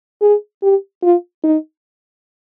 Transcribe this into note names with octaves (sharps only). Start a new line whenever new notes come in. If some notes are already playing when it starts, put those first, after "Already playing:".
G#4
G4
F4
D#4